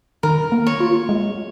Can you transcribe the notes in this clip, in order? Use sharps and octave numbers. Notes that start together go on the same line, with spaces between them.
D#3 A#4
A#3
C#5
F4
G#3